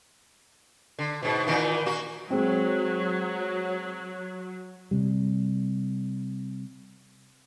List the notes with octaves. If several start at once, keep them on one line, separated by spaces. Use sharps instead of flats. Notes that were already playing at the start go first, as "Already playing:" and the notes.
D3
G#2 B2
A#2 D#3 E3
A#3 F#4
F#3 G#3 C4
C3 G3